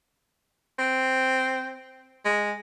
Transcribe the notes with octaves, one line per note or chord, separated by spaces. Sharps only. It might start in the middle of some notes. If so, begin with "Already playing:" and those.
C4
G#3